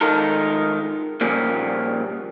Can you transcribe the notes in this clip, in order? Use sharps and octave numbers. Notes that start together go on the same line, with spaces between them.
D#3 G#3 D#4 F4 A4 A#4
A#2 C#3 F3 G3 A#3